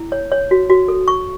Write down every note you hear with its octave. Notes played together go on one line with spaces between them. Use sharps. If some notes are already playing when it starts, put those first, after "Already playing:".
Already playing: E4
C#5
C#5
F#4
F#4
A4
C#6